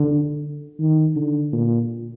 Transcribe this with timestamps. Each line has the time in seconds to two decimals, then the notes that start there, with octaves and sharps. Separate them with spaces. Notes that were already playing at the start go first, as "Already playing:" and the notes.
Already playing: D3
0.79 D#3
1.16 D3
1.53 A#2